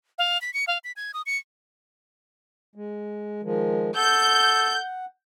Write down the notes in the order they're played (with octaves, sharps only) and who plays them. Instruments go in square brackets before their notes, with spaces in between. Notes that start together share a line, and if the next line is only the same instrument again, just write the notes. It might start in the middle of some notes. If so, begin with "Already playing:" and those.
[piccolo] F5
B6
C#7
F5
B6
G#6
D#6
C#7
[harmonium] G#3
D#3 F3 G#3
[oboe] A4 [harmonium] F#5 [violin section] G6